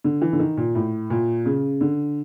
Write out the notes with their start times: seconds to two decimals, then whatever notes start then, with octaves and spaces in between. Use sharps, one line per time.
0.04 D3
0.22 E3
0.33 D3
0.39 D#3
0.57 A#2
0.75 A2
1.10 A#2
1.46 C#3
1.81 D3